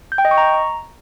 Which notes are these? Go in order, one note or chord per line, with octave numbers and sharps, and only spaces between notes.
G6
G5
D#5
C#6
A#5